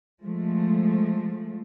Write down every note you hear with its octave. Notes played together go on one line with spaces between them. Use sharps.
F3 G#3 A3